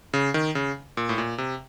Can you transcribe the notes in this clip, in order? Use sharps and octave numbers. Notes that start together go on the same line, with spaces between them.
C#3
D#3
C#3
A#2
A2
A#2
C3